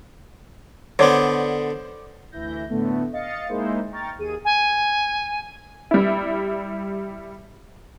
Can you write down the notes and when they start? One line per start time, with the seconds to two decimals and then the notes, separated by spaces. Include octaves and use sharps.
0.99 D3 B3 C5 C#5 D6
2.32 D2 E3 E4 G6 A#6
2.69 A2 D3 A3 B3
3.12 D#5 F5 A6 C#7
3.48 G#3 A#3 D#4 E4 C5
3.91 G5 A#5 C#6 F6 A6
4.18 D#2 G#4 D#7
4.45 G#5
5.91 G3 E4